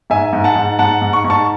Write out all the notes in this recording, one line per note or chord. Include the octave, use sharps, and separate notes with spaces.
G#2 E5 G#5
G#2
F#5 A5
G#2
G#2 F#5 A5
G#2
C#6
G#2
A5 C#6